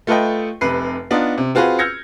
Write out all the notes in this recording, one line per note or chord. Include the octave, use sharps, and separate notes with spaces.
A3 F4 A4 B4 D#5 G5
F1 C3 B4 C7
B3 D4 D#4 F4
C3
C4 F4 F#4 G#4 B4
E6 F6 G6 G#6 A#6 C#7